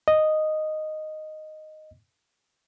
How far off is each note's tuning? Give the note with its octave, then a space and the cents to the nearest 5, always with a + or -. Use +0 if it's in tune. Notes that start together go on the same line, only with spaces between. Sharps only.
D#5 -5